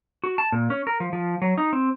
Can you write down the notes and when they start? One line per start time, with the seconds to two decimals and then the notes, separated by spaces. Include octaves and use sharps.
0.24 F#4
0.38 A5
0.52 A#2
0.70 C#4
0.87 A#4
1.00 F3
1.13 F3
1.42 F#3
1.58 D#4
1.73 C4